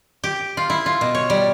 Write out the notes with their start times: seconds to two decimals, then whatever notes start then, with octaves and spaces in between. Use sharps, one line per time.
0.24 G4
0.57 F4
0.70 E4
0.86 F4
1.01 B2
1.15 C#5
1.30 G3